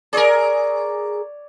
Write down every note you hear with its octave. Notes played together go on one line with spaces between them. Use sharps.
G#4 A#4 C#5 D5